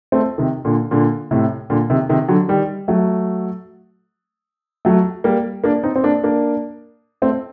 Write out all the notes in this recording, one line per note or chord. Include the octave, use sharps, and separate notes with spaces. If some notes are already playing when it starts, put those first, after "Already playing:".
A3 C4
C3 D#3
A#2 D3
A#2 D3
A2 C3
A#2 D3
C3 D#3
C3 D#3
D3 F#3
D#3 G3
F#3 A3
F#3 A3
G3 A#3
A#3 D4
C4 D#4
C4
A#3 D4
A#3 D4
A3 C4